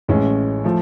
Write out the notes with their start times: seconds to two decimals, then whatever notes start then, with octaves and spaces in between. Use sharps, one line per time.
0.08 A1 A2 G#3 C#4
0.64 F3 A3